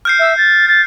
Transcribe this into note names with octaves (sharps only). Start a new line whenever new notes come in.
F6 G6 C7
E5
A6
A6